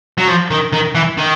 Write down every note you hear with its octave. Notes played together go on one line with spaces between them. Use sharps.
F#3
F3
D#3
D#3
E3
D#3